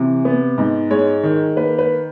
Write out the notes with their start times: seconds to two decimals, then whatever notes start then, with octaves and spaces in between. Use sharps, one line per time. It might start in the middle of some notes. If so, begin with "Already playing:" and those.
Already playing: C3 E3
0.25 B3
0.58 G#2
0.91 G#3 C#5
1.23 D#3
1.56 A#3 B4
1.78 B4